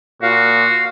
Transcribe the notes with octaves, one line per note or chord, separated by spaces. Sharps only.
A#2 F#4 F5